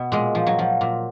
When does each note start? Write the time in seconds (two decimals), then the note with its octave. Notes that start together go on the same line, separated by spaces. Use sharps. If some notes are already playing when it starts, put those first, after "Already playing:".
Already playing: B2
0.12 A#2 G#3
0.35 F3
0.46 F#3
0.59 F3
0.81 A#2